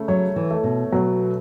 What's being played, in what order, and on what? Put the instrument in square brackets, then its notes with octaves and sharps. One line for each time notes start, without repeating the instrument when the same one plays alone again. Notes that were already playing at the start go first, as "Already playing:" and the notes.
Already playing: [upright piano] C#3 A3
[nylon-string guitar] F#3 [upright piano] C#5
[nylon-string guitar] E3
[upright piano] A3
[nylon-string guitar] B2
[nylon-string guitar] B2 [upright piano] F#3